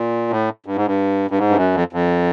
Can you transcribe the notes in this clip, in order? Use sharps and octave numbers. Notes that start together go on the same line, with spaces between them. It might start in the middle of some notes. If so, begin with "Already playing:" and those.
Already playing: A#2
A2
G2
G#2
G2
G2
G#2
G2
F#2
F2
F2